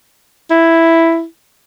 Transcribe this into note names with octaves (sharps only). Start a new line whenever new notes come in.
E4